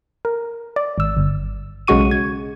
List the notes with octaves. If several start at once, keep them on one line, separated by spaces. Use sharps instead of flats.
A#4
D5
G#1 E6
G1
B1 C#3 G#3 F#4 C#6 D#7
G#6